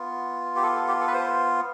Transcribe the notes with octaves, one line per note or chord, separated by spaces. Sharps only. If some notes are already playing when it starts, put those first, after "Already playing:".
Already playing: B3 F4
G4
A4
A4
G4
A4
B4
C5